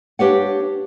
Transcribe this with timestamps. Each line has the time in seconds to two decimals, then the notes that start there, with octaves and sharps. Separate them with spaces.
0.19 D4 G4 B4 C#5 F5 F#5